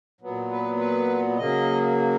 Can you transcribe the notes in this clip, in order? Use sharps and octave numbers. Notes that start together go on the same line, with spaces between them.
A#2 F#3 B3
B4
B4
C#3 F#3 A#3 D#5